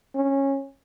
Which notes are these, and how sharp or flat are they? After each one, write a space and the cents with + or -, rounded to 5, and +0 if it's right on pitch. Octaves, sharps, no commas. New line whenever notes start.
C#4 -15